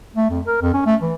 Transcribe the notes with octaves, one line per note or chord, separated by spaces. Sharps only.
A3
F2
A#4
F2
C#4
A3
E3